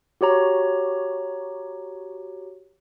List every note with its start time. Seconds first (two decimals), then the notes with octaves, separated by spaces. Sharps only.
0.21 F#4 G4 C#5 A#5